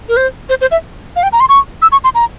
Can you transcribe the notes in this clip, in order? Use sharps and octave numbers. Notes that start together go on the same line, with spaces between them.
A#4
C5
C5
C5
E5
F5
G5
A#5
C6
C#6
E6
C#6
C6
A#5